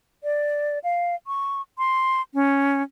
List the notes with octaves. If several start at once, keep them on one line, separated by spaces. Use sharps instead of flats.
D5
F5
C#6
C6
C#4